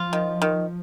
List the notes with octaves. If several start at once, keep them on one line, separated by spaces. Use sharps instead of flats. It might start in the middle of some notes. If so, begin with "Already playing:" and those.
Already playing: F3 F4
D#3
D#3